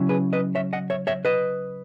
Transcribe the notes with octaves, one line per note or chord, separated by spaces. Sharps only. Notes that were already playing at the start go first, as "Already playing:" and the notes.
Already playing: C#3 F#3 C#4 E4
G#4 B4
B4 D#5
C#5 E5
D#5 F#5
C#5 E5
C#5 E5
B4 D#5